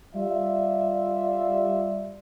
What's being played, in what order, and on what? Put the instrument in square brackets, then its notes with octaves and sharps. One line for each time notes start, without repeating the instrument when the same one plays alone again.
[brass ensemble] G3 F4 D5 E5